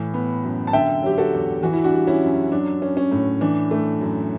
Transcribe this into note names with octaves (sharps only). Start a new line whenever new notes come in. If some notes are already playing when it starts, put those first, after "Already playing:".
Already playing: A2 E3
B3
F#2
A5
D3 E5 G5
F#3 G4
F#4 A4
E2
E3 F#4
E4
D4 F#4
G3
C#4 E4
F#2
F#3 D4
C#4
C#4
A2
E3 D4
A3
F#2